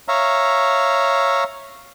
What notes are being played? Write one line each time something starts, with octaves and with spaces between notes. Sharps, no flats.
C#5 E5 F5 A#5